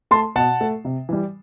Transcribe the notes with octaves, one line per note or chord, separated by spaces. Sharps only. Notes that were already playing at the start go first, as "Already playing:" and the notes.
A3 A5 C6
B2 F#5 A5
A3
C3
E3 G3